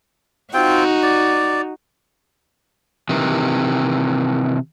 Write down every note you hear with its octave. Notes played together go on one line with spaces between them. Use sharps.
C4 D#4 F4 F#4 G5
D5
C3 D#3 E3